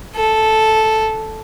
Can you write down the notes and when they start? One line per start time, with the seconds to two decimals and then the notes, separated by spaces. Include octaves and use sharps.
0.16 A4